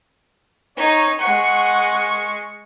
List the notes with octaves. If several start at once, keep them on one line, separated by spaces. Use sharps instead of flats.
D#4 C#5
G#3 F#5 C#6